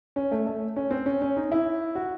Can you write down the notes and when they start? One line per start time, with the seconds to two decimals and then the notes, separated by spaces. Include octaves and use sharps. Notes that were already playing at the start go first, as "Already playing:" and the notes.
0.16 C#4
0.32 A3
0.47 A3
0.76 C#4
0.91 C4
1.06 C#4
1.22 C#4
1.36 D#4
1.52 E4
1.95 F#4